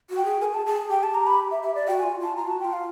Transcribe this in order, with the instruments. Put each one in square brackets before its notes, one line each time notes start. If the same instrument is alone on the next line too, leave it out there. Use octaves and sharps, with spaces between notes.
[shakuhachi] F#4
[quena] G5
[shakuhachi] G#4
[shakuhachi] G#4 A#4 [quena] G#5
[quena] A5
[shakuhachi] G#4 [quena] A5
[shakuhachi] G4 [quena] G5
[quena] A5
A#5
B5
E5
E5
D5
[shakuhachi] F#4 [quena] G5
[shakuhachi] F4 [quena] G#5
[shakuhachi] F4 [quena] A5
[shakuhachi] F4 [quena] A#5
[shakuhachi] F#4 [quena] A5
[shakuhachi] F#4 [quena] G5
[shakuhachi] F4
[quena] F5